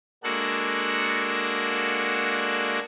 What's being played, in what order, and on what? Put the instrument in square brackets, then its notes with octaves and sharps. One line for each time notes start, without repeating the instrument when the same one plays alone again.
[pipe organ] G#3 A#3 D4 F#4 A4 F#5